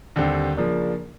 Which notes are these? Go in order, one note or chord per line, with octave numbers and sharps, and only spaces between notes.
D#2 D3 G3 C4
C#3 F3 A#3 D4